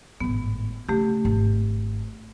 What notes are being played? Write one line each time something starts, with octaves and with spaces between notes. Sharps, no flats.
G#1 A2 B3
C#3 A3 G4
G#1